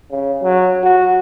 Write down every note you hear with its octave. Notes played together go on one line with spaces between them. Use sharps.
C#3
F#3
F#4